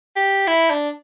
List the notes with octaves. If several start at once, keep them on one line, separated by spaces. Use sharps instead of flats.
G4
E4
D4